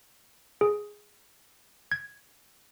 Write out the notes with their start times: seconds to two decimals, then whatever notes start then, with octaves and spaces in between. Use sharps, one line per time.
0.61 G#4
1.92 G#6